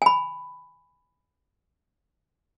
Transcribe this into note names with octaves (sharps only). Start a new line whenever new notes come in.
G#5 B5